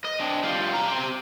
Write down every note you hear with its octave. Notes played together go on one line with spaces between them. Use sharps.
D#5
C4 D4
G3 F4
C3 A#5
G4 C5